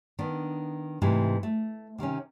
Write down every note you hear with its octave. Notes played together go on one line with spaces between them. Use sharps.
D#3 B3 D4
G#2 C3 E3 A3
A3
C3 D#3 C4 C#4